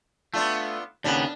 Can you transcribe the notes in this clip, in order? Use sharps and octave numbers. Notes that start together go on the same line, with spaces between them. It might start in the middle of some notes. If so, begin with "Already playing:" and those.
A3 B3 D4 F4
D#2 C#3 B3 D4